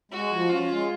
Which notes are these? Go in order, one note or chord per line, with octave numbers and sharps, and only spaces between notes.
G#3 F#4
F3
C#4 F4
G#3